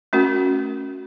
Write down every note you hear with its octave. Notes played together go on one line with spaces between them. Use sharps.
A3 C#4 F#4 A#4